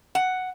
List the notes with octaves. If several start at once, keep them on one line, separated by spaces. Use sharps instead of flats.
F#5